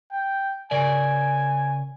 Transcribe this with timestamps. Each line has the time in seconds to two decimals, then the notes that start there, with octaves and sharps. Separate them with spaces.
0.11 G5
0.71 C#3 A#4 D5 G#5